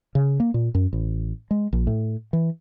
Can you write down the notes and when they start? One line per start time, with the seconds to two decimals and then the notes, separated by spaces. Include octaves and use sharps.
0.15 C#3
0.40 A#3
0.54 A#2
0.75 F#2
0.93 A1
1.51 G#3
1.73 A#1
1.87 A2
2.33 E3